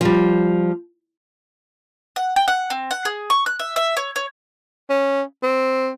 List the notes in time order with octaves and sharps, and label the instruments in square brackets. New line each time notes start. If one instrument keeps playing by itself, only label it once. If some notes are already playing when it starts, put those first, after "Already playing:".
[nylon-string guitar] F3 G3
[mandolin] F#5
G5
F#5
C4
F#5
G#4
C#6
F#6
E5
E5
C#5
C#5
[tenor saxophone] C#4
C4